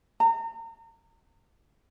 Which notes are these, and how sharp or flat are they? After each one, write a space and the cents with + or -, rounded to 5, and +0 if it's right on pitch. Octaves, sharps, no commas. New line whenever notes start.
A#5 -35